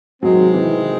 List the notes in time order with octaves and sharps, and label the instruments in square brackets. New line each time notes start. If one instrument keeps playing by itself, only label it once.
[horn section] C3 D#3 G#3 C4 [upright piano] F#3
[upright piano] E3